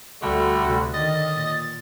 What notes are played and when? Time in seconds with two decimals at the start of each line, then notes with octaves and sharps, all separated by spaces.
0.22 D2 D3 G3 A3 F#4
0.60 D2 C3
0.94 D3 D#3 D#5 A6
1.32 A#2